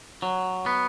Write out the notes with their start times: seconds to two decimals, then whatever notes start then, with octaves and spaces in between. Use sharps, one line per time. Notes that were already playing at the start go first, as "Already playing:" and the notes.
0.22 F#3
0.66 B3